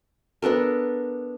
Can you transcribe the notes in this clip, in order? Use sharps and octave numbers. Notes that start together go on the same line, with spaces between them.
B3 D4 A4 A#4